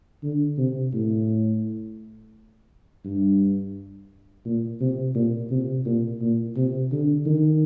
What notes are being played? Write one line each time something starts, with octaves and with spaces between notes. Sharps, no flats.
D3
C3
A2
G2
A#2
C3
A#2
C3
A#2
A#2
C3
D3
D#3